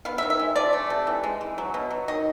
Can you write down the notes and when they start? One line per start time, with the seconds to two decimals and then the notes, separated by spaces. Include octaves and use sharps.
0.05 B3 F5
0.18 E5
0.22 D#3
0.30 E5
0.39 G#3
0.56 F3 D5
0.73 A3
0.90 C3
1.07 E3
1.24 G#3
1.41 E3
1.58 F#3
1.74 B2
1.91 F#3
2.08 D#3 D#5